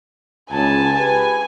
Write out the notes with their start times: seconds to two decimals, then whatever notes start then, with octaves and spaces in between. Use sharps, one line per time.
0.50 C#2 G#5 A5
0.96 G4 G#4 B4 G#5